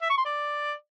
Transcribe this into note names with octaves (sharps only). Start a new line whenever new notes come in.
E5
C#6
C6
D5